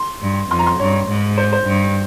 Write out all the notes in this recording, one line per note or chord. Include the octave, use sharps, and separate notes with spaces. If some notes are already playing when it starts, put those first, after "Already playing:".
Already playing: C6
G2
F2 C6
A#5
C6
G2 C#5
G#2
C5
C5
G2